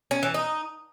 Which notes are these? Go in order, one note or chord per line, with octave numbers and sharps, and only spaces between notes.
C#4
E3
D#4